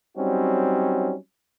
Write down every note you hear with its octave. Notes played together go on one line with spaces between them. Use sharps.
F#3 G3 C4 C#4 D#4 F#4